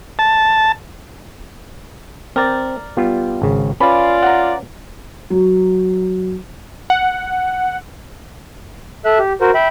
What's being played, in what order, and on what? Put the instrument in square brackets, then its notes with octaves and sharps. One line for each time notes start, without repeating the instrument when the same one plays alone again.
[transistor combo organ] A5
[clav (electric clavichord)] C4 G5 [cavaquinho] A#4 D5
[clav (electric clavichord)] G3 B3 F4
G#1 C#3
[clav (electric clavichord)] C#4 B4 [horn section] F4 D5 [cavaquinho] F5 B5
[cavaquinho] F#5 A#5
[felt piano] F#3
[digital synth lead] F#5
[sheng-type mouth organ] A4 E5 F#6
G4
F#4 A#4 C5
E5 G5 B5